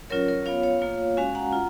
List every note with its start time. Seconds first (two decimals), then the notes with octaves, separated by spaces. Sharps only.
0.10 F#3 C#4 F4 A#4 C#5
0.28 A#4 C#5
0.46 B3 F4 C#5 F5
0.63 C#5 F5
0.82 A#3 F4
1.17 G#3 C#4 F#4 F5 G#5
1.35 F#5 A#5
1.53 F4